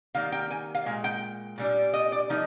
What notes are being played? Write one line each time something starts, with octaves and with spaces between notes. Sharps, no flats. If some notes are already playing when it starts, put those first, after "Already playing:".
D#3 G3 A#3 F5
G5
G#5
F5
A#2 G#3
G5
A#2 G3 D4
D#5
D5
F3 A#3 D#4